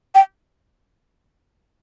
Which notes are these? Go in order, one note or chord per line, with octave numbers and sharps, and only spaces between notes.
G5